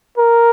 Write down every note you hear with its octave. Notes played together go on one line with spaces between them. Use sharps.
A#4